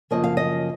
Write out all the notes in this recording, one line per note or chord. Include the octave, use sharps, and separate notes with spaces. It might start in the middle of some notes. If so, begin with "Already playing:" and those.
F#2 C#3 F3 A#3 D#5
F5
D#5